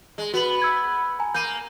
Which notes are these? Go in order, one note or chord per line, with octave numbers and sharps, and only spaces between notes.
G#3
B3 F#4 B4 F#7
E6 G#6
G#5 A#5
A#3 G6 D#7